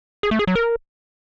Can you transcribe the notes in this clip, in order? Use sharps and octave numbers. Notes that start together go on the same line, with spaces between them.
G#4
A3
G#4
F#3
A#4